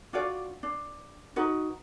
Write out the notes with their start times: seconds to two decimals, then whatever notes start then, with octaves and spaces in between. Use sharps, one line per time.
0.13 D4 F4 F#4 D5
0.63 D4
1.36 D#4 F#4 B4